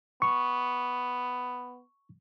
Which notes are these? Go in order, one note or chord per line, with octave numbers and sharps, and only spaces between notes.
B3 C#6